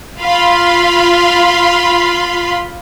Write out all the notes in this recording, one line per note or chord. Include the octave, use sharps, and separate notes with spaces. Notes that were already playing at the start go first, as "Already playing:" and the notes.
F4 F5 B5 C6